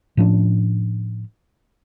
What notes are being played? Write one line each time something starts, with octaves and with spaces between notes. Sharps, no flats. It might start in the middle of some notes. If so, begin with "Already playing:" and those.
A2 F3 C#4 D4